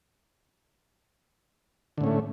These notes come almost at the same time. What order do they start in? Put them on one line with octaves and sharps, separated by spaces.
D3 A2 C#4 A3